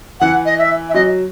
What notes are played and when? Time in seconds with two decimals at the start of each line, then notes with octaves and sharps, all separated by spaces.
0.20 E3 F#5
0.45 D#5
0.58 E5
0.89 E5
0.94 F#3 D#5